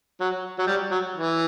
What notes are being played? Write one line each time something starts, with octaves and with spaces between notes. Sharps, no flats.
F#3
F#3
G3
F#3
E3